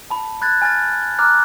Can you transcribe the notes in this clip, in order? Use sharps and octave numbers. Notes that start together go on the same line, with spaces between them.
A5 B5
B5 F#6 G#6 A6
G#5 F6 A6
A#5 D6 F6 F#6